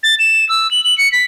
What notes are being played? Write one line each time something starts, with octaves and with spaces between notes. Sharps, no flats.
A6
E7
E6
F#7
F#7
C#7
B6